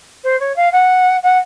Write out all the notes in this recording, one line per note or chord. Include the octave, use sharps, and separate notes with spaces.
C5
C#5
F5
F#5
F#5